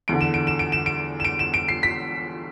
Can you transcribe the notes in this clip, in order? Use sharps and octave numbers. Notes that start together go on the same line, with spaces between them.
E2 D3 D7
E7
D7
E7
D7
E7
D7
E7
D7
E7
D7
C7
B6